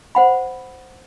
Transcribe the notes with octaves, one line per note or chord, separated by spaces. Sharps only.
C5 F#5 B5